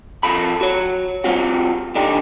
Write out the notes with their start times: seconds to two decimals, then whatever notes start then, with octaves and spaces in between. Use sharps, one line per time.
0.23 F2 F4 A4 B5
0.61 F#4 C#5
1.24 G3 C4 F4 F#4
1.95 D3 D4 D#4 G4